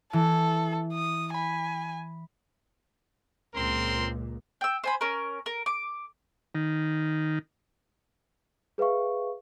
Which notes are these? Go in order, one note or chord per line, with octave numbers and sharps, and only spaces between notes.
E3 A4
D#6
G#5 B5
C#2 A#2 C4 A#4 C6
G5 E6
C5 G#5 B5
C#4 A#4
A#4
D6
D#3
G#4 B4 E5 F5 C#6